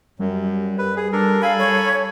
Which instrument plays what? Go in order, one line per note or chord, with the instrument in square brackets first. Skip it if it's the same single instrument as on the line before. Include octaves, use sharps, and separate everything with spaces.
[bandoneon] F#2 [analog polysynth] G3
[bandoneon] B4
G#4
D4 A4 A#4
[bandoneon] A4 G#5 B5 [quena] F5
[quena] C#5